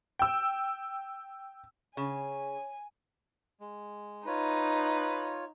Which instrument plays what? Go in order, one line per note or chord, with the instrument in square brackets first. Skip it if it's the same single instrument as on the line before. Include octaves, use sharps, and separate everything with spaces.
[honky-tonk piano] G5 E6
[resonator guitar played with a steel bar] C#3 [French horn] C#5 [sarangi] G#5
[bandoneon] G#3
[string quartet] D#4 [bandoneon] F4 C#5 [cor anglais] B4